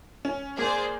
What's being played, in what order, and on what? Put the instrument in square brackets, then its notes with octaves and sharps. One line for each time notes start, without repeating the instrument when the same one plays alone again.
[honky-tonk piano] C#4
[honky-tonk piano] A#3 [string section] G#4 C5 D5